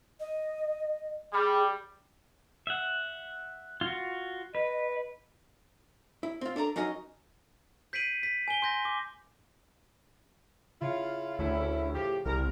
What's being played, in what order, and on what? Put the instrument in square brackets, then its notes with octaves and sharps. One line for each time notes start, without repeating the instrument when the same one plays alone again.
[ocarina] D#5
[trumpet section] G3 [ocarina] G#4
[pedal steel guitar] E5 F#5
F4 F#4
[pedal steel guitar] B4 [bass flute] D#5
[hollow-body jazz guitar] E4
C4 F4
D4 A4 A#4 A#5
F#3 C#4 D#4 A#4 D#5
[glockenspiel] G6 B6 C7 D7 D#7 F#7
B6
G#5 G7
C6 G6 A#6
D6
[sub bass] C#3 [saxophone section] C#4 E4 F4
[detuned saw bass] D2 [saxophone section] C#4 E4
[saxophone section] A2 F3 G4
[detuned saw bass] C2 [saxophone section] A#4